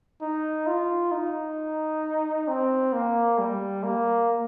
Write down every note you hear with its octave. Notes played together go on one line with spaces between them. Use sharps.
D#4
F4
D#4
C4
A#3
G3
A#3